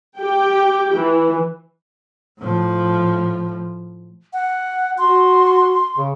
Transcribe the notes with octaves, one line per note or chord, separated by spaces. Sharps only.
G4 G5
E3
A2 F3
F#5
F#4 C6
C#3